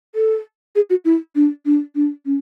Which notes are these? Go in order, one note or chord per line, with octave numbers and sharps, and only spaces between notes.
A4
G#4
F#4
E4
D4
D4
D4
C#4